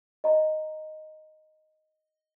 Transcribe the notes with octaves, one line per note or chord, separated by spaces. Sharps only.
D#5 A#5